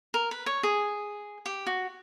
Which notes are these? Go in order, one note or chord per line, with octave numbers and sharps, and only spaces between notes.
A#4
B4
C#5
G#4
G4
F#4